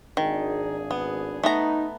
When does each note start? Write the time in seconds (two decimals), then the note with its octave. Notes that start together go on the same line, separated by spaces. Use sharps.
0.17 G#1 D#3 D4 G#4
0.91 B3
1.43 A3 B3 D#4 A#5